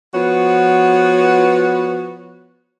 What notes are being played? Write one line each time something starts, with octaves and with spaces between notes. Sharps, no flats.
F3 B3 F#4 B4 C#5